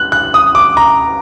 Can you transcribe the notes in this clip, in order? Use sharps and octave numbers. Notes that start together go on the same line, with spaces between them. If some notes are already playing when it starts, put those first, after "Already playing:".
Already playing: F#6
F#6
D#6
D6
A#5